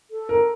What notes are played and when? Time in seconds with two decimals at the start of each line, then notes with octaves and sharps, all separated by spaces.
0.11 A4
0.29 A#4